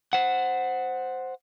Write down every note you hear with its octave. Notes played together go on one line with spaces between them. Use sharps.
C5 F#5